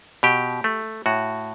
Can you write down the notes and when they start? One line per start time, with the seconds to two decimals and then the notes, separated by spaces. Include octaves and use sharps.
0.23 B2 G4
0.64 A3
1.06 A2 F#4